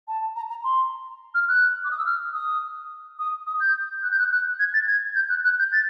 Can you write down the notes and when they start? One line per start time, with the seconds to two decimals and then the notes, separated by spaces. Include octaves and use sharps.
0.08 A5
0.36 A#5
0.50 A#5
0.64 C6
1.34 F6
1.49 F#6
1.84 D6
1.91 D#6
1.98 E6
2.06 F6
2.33 D#6
3.19 D#6
3.47 D#6
3.60 G6
4.03 F#6
4.11 G6
4.19 F#6
4.32 F#6
4.59 G#6
4.74 A6
4.87 G#6
5.15 G6
5.29 F#6
5.44 F#6
5.59 G6
5.73 A6